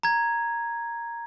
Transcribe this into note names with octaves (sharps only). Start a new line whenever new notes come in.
A#5 G#6